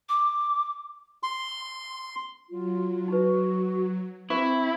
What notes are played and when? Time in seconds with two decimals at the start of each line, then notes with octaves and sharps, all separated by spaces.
0.09 D6
1.23 C6
2.50 F#3 F4
3.08 D#4 F#4 B4
4.30 C4 E4 C5 C#6 D6